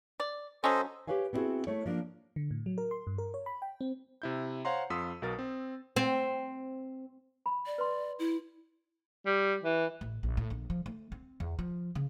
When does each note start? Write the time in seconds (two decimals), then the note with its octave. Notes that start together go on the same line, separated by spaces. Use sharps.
0.20 D5
0.64 F#3 C#4 A4 C5 D#5
1.07 G4 A4 B4 C#5 F5 G#5
1.33 B3 C4 D#4 E4 F#4 G#4
1.67 A3 E4 C#5
1.86 F3 A#3 D4
2.36 D3
2.51 A2
2.66 F#3
2.78 A#4
2.91 C6
3.07 G2
3.18 A#4
3.34 C#5
3.46 B5
3.62 G5
3.81 C4
4.22 C3 E4 G6
4.65 C5 C#5 F5 F#5 A#5 C6
4.90 F2 F4 C6 D#6 E6 B6
5.22 B1 B2 A#4 A6
5.39 C4
5.96 C4
7.46 B5
7.66 D5
7.78 B4 C6
8.19 E4
9.26 G3
9.64 E3
10.01 A1
10.23 A#1
10.37 A2
10.50 A#1
10.70 F3
10.86 A3
11.12 C4
11.40 E2
11.59 F3
11.95 C#3